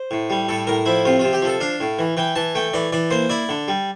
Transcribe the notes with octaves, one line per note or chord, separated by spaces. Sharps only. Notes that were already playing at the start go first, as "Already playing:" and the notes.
Already playing: C5
A2
G3
A2 A4
A2 A#4
F3 E4
C3 F4
C3 F4
G4
F3 A4
D4 F5
A2
E3
E3 G5
E3 A5
A3 G5
E3 D5
E3 D5
A#3 C5
E4 D5
D3
G3